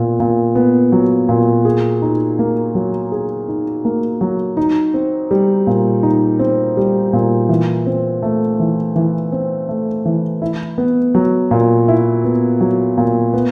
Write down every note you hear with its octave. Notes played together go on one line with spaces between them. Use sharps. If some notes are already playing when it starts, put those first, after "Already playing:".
Already playing: A#2 B3
A#2
B3
F#3
A#2
G#4
D#4
A#3
F#3
G#4
D#4
A#3
F#3
D#4
C4
G3
A#2
D#4
C4
G3
A#2
E3
C4
A3
E3
E3
C4
A3
E3
E4
B3
F#3
A#2
E4
B3
F#3
A#2
B3